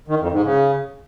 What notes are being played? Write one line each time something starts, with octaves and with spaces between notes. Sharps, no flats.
D#3
F2
G#2
C#3